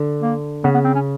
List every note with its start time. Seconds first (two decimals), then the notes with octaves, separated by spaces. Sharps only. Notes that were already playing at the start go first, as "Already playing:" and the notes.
Already playing: D3
0.22 A#3
0.64 C#3 B3
0.74 B3
0.85 C4
0.95 C#4